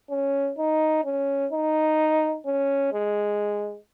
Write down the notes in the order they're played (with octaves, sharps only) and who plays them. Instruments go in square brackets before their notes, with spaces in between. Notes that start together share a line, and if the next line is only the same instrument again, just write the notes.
[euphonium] C#4
D#4
C#4
D#4
C#4
G#3